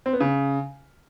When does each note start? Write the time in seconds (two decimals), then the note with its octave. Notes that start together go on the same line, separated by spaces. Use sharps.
0.06 C4
0.13 B3
0.20 C#3